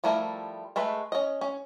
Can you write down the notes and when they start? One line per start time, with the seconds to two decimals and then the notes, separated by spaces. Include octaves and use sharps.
0.04 F3 G3 A3 E4 A#4
0.76 G#3 A3 B4 B5
1.12 C#4 D#5
1.41 C#4